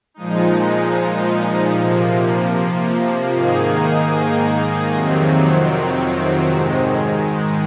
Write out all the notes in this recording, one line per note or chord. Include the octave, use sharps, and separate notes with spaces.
A#2 F3 G#3 D#4
C3 F3 A#3
G#2 D#3 A#3 D#4 G#4
F2 C3 D#3 F#3 C4
G#2 D#3 G#3